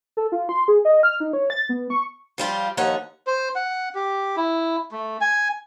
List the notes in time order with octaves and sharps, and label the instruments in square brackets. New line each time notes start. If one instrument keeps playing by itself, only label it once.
[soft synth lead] A4
F4
C6
G#4
D#5
F6
D#4
C#5
A6
B3
C#6
[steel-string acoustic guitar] F3 G3 F4 G4
D#2 F3 D#4 C#5 F#5
[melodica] C5
F#5
G4
E4
A3
G#5